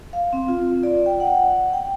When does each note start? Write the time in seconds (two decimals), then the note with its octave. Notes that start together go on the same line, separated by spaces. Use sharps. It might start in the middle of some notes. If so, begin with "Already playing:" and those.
0.13 F5
0.33 C4
0.48 F4
0.83 D5
1.06 G5
1.20 F#5
1.73 G5